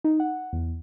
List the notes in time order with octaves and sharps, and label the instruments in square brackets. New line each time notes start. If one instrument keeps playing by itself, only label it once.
[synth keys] D#4
F#5
E2